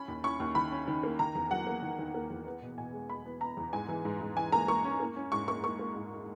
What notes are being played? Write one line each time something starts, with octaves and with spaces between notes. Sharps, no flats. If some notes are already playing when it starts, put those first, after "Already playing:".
Already playing: C#4 B5
D#2
C#4 C#6
D#2
D#3 B5
C#4
D#3
A#3
D#3 A#5
E2
F#3 F#5
A#3
D#3
D#3
A#3
E2
B3
B2
B2 G#5
G#3
B3 B5
B3
B3 A#5
E2
G#2 G#5
E3
G#2
G#2
E3 G#5
A#3 A#5
A#3 C#6
C#4
A#3
C#4
G#2 C#6
A#3 C#6
A#3 C#6
A#3
G#2